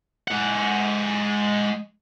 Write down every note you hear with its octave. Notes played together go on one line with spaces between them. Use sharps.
G#3 F#5